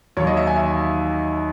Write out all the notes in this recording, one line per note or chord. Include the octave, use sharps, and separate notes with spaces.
D#2 D#3 F#3 C#5
D#5
E5
G#5
E5